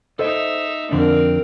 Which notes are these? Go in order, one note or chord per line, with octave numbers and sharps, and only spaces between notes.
D#4 A4 C5 D#5 E5
F2 D3 C4 D4 A#4